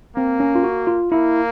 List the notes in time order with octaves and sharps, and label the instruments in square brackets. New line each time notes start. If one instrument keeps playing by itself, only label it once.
[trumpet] A#3 [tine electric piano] C4
[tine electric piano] C#4
F4
F#4
F4
[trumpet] A#3 [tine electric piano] E4